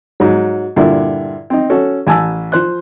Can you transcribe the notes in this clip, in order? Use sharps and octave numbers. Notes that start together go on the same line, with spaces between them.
G#2 F#3
G2 A#2 D3 E4
C4 D#4
C#4 F#4 A4
A1 G#5 A5 E6
F3 C5 F#6